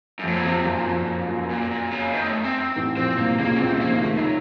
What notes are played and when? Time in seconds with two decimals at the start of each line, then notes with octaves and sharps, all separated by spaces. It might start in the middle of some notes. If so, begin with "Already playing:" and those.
0.19 F#2
0.24 F2 A2 F3
0.36 A#2
0.45 F2 C3 F3
0.58 C3
0.66 F#2 A#2
0.87 F2
1.08 F2
1.28 F#2
1.50 A#2
1.71 A#2
1.91 C#3
2.14 D#3
2.23 A#3
2.29 A3
2.44 C4
2.61 C4
2.76 A1 A2
2.97 A#1 A#2 C4
3.18 C2 C3 A#3
3.38 C#2 C#3 A#3
3.56 C#4
3.60 C#2 C#3 C4
3.72 A3
3.81 F3 A#3
3.89 D#3
3.95 C#3
4.01 D#2 D#3 A3
4.17 F#3